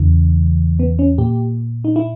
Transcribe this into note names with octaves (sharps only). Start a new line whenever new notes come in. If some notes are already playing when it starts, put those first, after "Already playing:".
Already playing: E2 C#3 E3
B3
C#4
A#2 G4
D#4
E4